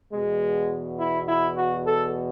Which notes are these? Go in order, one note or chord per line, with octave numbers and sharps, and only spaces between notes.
E2 B2 G#3
E4
E4
F#4
A4